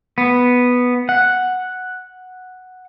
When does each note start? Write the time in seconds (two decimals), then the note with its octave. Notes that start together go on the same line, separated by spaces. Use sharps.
0.18 B3
1.09 F#5